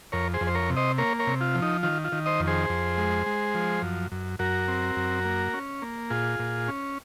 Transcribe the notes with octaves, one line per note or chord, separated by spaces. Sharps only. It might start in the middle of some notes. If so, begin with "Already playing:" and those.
F2 A#4 C#5
G#4 C5
F2
C5
A#4 C#5
C3
C5 D#5
A#3 A#4 C#5
A#4 C#5
C3
F4
F3
D#4
D#3 F4
F4
D#3
C5 D#5
F2
G#4 C5
F2
G#3
G#3
F3
F#2
F#2
F#2 F#4 A#4
C4
F#2
A#3
C#4
A#3
A#2 F4 G#4
A#2
C#4